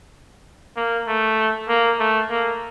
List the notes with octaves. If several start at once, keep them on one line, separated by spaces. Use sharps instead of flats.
A#3
A3
A#3
A3
A#3